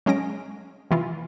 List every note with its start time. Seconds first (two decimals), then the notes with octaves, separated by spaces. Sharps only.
0.06 F#3 G#3 C#4 A#6 D7
0.91 C3 E3 F4